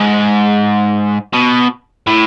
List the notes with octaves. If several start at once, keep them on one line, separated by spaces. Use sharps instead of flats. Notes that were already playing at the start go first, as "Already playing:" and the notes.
Already playing: G#2
B2
A2